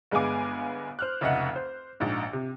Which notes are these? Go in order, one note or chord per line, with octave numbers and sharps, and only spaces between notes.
G1 G#3 B3 F5 G#5 D6
C5 F6 F#6
F1 C#2 D#5 E5 F#5
C5
A#1 G#2
C3